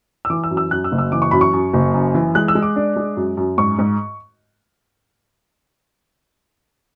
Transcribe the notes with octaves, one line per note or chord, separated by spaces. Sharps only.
E6
E3 D6
E6
F#2
E6
F#2 F#6
E6
F#1
E6
E3 D6
C#6
F#2 B5
C#6
F#2
F#1
F#2
E3
G#3 F#6
E6
G#3
D6
D4
G#3
F#2
F#2
G#2 C#6
G#2